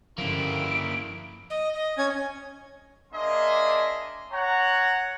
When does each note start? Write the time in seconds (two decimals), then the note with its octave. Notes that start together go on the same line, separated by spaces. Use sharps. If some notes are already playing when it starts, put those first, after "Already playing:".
0.18 G2 D3 F3 A#3 C#4 E4 D7
1.50 D#5
1.74 D#5
1.98 C#4 G#6
3.13 A#3 D4 G#4 D#5 E5 C6
4.32 C#5 F#5 A#5